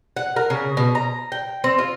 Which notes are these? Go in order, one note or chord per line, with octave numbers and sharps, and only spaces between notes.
F#5
A#4
C#3
B2
A#5
G5
C4
F4